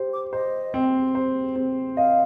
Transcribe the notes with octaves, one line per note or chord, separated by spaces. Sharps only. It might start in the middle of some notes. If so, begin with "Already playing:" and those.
Already playing: G4 C5
D6
C5 D#5
C4
C5
C4
D#5 F5